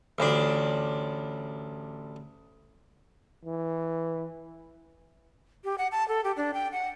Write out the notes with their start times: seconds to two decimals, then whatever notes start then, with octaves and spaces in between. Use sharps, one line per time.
0.18 A1 D2 D4
3.45 E3
5.64 G4
5.78 F#5
5.92 A5
6.08 A4
6.24 G4
6.37 D4
6.54 G5
6.72 F#5